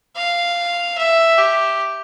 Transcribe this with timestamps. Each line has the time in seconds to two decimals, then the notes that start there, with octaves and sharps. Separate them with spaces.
0.16 F5
0.98 E5
1.38 G4